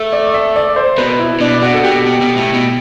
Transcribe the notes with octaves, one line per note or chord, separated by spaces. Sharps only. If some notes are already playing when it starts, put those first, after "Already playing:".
Already playing: A3
D5
E5
D5
C5
B2 B4
E4
B2 D4
B2 F#4
A4
B2 G4
B2
B2
A2
B2